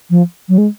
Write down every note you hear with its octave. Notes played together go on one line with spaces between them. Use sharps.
F3
F#3
G#3